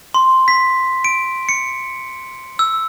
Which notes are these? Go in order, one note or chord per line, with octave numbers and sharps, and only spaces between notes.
C6
B6
D7
C#7
E6